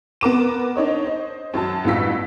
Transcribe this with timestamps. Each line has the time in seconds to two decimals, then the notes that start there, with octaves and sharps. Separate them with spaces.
0.21 B3 A#4 D6 E7
0.76 D4 D#4 C#5 D#5
1.05 C5 D#5
1.54 F#2 F#3 A5
1.84 A1 E2 G2 F4 E6 B6